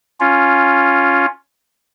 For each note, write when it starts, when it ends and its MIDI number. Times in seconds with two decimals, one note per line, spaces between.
0.20 1.26 61
0.20 1.26 65